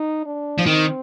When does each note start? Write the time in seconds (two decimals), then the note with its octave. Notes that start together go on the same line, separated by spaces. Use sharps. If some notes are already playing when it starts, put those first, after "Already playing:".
Already playing: D#4
0.25 D4
0.58 F3
0.66 D#3 C4